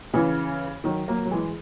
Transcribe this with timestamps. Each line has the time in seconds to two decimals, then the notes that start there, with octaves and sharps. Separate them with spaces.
0.14 C#3 E3
0.84 D#3 F#3
1.08 F#3 A#3
1.25 F#3
1.31 E3 G#3